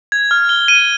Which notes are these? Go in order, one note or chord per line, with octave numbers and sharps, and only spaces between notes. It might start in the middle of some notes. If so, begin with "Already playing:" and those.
G#6
F6
G7
D#7